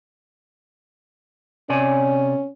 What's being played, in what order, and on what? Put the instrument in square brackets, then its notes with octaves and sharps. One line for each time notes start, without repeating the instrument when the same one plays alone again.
[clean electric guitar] C3 D5 G#5 [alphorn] C#4